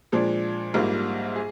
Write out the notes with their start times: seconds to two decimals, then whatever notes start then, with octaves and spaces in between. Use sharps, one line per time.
0.12 A#2 F3 G#3 D4
0.74 A#1 G#2 G3 A#3 F4
1.36 G#4